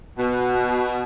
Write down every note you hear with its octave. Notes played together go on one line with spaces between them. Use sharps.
B2